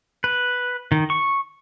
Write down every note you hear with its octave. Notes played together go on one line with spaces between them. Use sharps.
B4
D#3
C#6